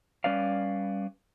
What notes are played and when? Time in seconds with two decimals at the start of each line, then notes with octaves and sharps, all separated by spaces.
0.24 G3 C#4 B4 D5 F5